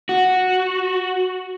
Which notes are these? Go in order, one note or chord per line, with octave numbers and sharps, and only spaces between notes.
F#4